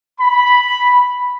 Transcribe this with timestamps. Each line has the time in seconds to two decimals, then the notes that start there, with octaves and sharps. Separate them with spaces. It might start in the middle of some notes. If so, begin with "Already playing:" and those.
0.21 B5